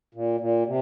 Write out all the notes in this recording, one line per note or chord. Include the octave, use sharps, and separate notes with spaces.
A#2
A#2
C3